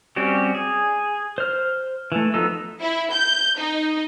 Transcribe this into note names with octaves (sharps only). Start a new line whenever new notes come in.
G3 C4 C#4 F#4 G4
G#4
C5 F6
E3 A3
F3 B3 D#4 A4 E6
E4
G6
D#4